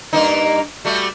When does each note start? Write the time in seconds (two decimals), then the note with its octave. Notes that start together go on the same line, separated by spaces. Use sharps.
0.13 G2 A#3 D#4
0.85 G3 A3 F#4